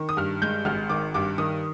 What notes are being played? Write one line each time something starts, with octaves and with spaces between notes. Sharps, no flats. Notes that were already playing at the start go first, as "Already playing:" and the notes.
Already playing: D#3
D#6
G2 F6
G#3 G6
G#1 F6
D#3 D6
G2 D6
D#3 D#6